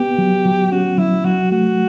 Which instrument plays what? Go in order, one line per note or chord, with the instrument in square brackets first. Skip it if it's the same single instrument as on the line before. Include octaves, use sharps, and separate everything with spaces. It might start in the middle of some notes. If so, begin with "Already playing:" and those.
Already playing: [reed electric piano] B3 [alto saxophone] G4
[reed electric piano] F#3
F#3
[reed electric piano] C#4 [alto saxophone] F#4
[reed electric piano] F#3 [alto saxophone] E4
[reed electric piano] F#3 [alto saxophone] F#4
[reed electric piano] A3 [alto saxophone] F#4